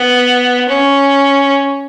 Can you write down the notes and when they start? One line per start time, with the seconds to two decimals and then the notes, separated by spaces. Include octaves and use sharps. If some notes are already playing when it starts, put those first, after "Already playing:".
Already playing: B3
0.68 C#4